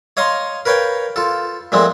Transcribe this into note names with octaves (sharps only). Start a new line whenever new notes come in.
C#5 D#5 F5 A#5 C6
A#4 B4 C#5 F5 G5
F4 A4
A#2 F3 G#3 A3 C4